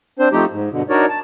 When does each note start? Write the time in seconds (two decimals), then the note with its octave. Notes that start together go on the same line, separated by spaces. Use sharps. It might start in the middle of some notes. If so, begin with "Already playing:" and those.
0.19 C4 D4 C5
0.32 F3 A3 C4 D#4 G4
0.51 G#2
0.70 G2 B2 D3
0.89 D4 D#4 F#4 A#4 C#5 D5
1.09 A5